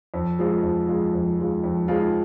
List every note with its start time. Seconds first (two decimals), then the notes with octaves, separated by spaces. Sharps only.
0.14 F2
0.39 F3 G#3 F4
0.63 F2
0.88 F3 G#3 F4
1.14 F2
1.39 F3 G#3 F4
1.64 F2
1.88 F3 G#3 F4